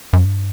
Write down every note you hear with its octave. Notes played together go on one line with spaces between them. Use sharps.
F#2
G2